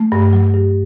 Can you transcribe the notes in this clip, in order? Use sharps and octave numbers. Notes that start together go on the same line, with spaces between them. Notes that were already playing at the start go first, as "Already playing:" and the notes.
Already playing: A3
G2
F#3
G2